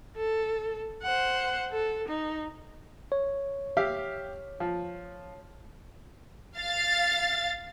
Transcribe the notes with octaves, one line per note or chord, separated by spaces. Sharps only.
A4
C5 F#5
A4
D#4
C#5
G4 E5 F5
F3
F5 A6